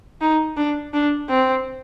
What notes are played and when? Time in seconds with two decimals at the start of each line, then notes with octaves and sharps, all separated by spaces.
0.21 D#4
0.57 D4
0.93 D4
1.30 C4